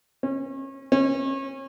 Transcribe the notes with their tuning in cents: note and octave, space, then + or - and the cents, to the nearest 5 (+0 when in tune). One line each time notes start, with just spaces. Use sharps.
C#4 -35
C#4 -35